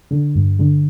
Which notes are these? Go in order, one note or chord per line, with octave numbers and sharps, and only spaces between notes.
D3
G2
D3